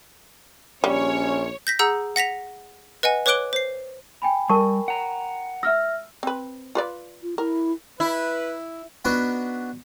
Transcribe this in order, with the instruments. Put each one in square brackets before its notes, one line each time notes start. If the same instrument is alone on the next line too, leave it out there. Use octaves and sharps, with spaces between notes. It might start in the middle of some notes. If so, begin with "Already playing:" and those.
[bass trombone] A#1 [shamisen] G3 [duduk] C#4 [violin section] C#5
[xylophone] G6 A#6 B6
G#4 F#5 A#5 E6 G6
F#5 A#6 B6 F7
B4 D#5 F#5 G#5
B4 C#5 D6 F#6 D7 G7
C5 C7
[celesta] G5 G#5 B5
[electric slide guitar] G3 [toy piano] A#4 A5 C#6
[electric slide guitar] F#5 A#5
[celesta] E5 F6 A#6 [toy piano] E6
[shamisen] C4 B4
F4 B4 D5
[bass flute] F4
[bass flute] E4 [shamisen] A#4
[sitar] E4 [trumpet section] B4
[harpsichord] B3 D4 D#4 F#4 B4